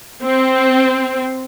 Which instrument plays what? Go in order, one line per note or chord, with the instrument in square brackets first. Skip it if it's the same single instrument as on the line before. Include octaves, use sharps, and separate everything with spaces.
[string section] C4